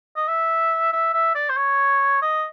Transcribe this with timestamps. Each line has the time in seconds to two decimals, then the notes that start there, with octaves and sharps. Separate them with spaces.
0.16 D#5
0.28 E5
0.93 E5
1.14 E5
1.35 D5
1.50 C5
1.57 C#5
2.22 D#5